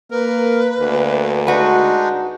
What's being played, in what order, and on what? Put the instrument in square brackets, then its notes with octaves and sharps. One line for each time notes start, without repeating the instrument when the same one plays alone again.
[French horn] A#3 [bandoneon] A#4 [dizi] B4
[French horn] D2 [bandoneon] A#3
[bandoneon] G#3 D4 D#4 [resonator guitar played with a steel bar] F#4 B4